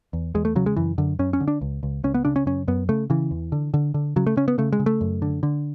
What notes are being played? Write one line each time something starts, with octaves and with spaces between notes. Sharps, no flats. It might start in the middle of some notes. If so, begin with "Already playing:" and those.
E2
E2 G#3
A3
C#3 F#3
G#3
F#2 E3
F#2 D3
F#2 C#4
C#4
D3
D4
C#2
C#2
C#2 C#4
B3
C#3 D4
C#4
F#2 C#4
F#2 B3
C#3 A3
C#3 E3
E2
D3
D3
D3
C#3 F#3
A3
C#3 C#4
B3
C#3 A3
G#3
C#3
A3
F#2
D3
D3